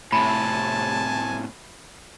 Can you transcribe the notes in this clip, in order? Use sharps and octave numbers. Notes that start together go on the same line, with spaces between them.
A2 C3 G#5 A5 B5